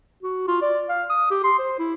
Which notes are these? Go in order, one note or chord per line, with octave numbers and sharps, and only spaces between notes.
F#4
F4
D5
F5
D#6
G4
C6
C5
E4